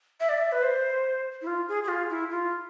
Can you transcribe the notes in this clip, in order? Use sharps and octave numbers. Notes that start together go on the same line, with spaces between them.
E5
D5
E5
B4
C5
E4
F4
G#4
G#4
F4
E4
F4